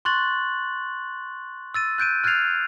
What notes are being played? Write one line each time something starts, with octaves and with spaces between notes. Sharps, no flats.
C6 C#6 F#6 A6 F#7
E6 A6 D#7
F#6 G6 D7 D#7
F6 F#6 G#6 A6 C7 F7